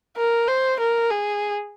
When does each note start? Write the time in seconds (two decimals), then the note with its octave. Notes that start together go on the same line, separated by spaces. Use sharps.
0.17 A#4
0.48 C5
0.79 A#4
1.11 G#4